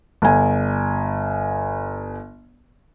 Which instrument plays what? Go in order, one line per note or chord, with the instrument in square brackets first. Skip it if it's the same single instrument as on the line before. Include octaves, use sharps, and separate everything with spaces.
[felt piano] G1 G#5